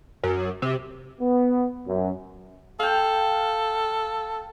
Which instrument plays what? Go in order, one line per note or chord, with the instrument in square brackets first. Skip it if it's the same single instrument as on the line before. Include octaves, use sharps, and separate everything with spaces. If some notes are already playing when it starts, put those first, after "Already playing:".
[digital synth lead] F#2
C3
[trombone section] B3
F#2
[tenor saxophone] A4 [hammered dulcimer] F5 G5